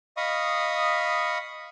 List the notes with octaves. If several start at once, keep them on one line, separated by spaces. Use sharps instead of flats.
D#5 F5 B5 C#6 D#6